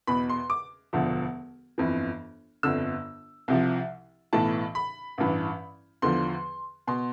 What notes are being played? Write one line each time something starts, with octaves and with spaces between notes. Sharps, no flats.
E2 B2 B5
C6
D6
E1 D2 D3 F3
G1 F2 E3
G1 F2 D3 E6
C2 C3 F3
B1 A2 E3 A5
B5
A1 G2 E3
E2 D3 F3 C6
B2 C6